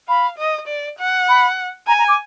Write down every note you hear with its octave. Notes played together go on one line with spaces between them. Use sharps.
F5 B5
D#5
D5
F#5
B5
G#5 A#5
A#5
D6